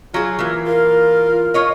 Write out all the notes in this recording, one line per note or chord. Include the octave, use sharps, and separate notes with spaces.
F#3 F4 G#4
E3 A#3
F4 A#4
F4 C#5 D#5